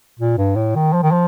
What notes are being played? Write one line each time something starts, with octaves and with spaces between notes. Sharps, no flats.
A#2
G2
A2
D#3
F3
D#3
F3